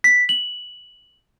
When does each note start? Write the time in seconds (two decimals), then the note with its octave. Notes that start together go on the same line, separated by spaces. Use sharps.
0.04 B6
0.29 F#7